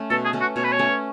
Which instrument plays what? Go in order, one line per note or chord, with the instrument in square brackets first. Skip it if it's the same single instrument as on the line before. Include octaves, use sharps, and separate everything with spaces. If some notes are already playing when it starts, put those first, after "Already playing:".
Already playing: [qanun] A3 C#4
[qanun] B2 [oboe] A4
[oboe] G#4
[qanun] A3 C#4
[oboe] F#4
[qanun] B2 [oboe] C#5
[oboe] B4
C#5
[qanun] A3 C#4